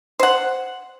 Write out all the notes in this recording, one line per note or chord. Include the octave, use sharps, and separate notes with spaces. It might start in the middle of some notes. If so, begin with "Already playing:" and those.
C5 F#5